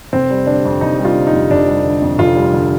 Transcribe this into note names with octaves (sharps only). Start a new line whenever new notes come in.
F1 C4
G3
D3 D4
F2
F1 D#4
G3
F4
D3
D#4
F2
F1 D4
G3
D3
F2
F1 F4
G3
D3